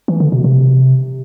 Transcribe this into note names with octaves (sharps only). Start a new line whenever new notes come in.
E3
D3
B2
C3